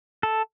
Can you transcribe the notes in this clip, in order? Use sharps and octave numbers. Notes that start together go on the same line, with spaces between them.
A4